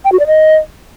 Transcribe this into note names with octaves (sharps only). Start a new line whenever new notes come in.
G5
F#4
D5
D#5